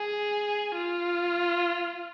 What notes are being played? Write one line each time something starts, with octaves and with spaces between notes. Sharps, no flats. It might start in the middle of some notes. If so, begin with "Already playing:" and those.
Already playing: G#4
F4